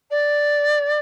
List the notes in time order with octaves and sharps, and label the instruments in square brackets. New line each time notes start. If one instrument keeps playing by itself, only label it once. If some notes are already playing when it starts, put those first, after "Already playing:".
[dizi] D5